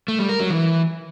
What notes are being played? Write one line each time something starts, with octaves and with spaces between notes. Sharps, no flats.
A3
G3
A#4
F#3
E3